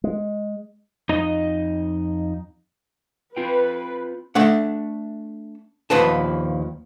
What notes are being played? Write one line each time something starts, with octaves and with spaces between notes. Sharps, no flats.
G#3
F2 D#4 D#5
C4 F4 B4 G5
A3 D4 F#5
D#2 F3 B4 A5